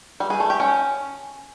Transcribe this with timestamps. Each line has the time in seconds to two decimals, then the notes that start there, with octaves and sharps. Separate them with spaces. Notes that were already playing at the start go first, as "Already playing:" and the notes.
0.20 G3
0.30 G#4
0.40 A3
0.50 G4
0.60 C#4